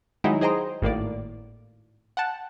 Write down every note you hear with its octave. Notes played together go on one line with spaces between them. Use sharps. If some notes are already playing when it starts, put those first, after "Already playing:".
D#3 F#3 G#3 D#4 E4
G#4 C5 D#5 G5 A#5 C6
G#1 A2 A#3 D5
F#5 G5 A5